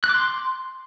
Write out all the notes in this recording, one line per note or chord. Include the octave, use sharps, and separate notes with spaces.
F#6
D6
C6